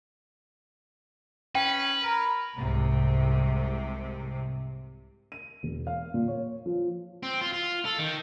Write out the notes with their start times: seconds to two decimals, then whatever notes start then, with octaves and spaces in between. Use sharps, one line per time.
1.55 C#4 B4 G5
2.03 A#4 A#5 B5
2.55 C2 G#2 C3
5.32 D#7
5.63 E1
5.87 F5
6.14 A#2
6.28 C#5
6.66 F3
7.23 C4
7.41 F4
7.53 F4
7.85 A4
7.99 D#3